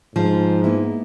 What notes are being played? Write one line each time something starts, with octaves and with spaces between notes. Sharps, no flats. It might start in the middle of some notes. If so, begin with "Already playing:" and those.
G#2 F3
A#3 B3 E4